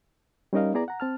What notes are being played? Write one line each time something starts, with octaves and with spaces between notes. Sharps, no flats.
G3 C#4 D#4 A#4 D#5 F5
B3 E4 G#4 D5 A#5
F#5 A#5
C4 A5 F6